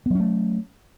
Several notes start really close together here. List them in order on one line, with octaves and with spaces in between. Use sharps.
B3 F#3 C#4 A3